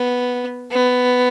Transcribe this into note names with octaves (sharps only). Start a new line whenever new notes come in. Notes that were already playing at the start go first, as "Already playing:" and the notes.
Already playing: B3
B3